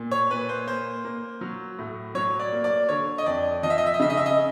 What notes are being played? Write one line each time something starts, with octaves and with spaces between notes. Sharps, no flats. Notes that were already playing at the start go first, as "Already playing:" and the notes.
Already playing: A#2
C#5
A#2 B4
C5
A#3 C5
A#3
F#3
A2
F#3 C#5
D5
A#3
D5
D3 C#5
D#5
F2 D5
F3 D#5
E5
D#5
E5
D#5
C#3 E5
D#5
E5
D#5